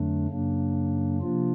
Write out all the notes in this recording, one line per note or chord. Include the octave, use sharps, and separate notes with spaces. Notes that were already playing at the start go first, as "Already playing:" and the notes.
Already playing: F2 D3 F#3 A3 D4
F#2 C#3 F#3 A#3 D4
C3 F3 A#3 D4 F4